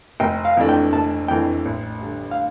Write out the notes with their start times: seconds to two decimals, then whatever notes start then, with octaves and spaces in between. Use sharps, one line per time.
0.20 F1 G5
0.45 F5
0.57 F2 E3 A3 D4
0.69 G5
0.93 F1 A5
1.28 F2 E3 A3 D4 G5
1.65 A1
2.01 G2 D3
2.31 F5